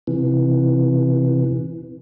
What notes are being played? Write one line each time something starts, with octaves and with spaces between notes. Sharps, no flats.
C3 E3